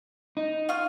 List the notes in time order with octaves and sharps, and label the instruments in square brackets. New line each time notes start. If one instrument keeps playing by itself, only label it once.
[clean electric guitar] D#4
[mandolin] F4 C#6 F6